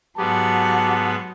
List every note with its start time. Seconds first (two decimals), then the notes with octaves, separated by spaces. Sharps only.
0.18 G#2 F#3 B3 G4 F#5 A5